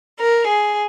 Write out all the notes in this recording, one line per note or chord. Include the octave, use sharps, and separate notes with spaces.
A#4
G#4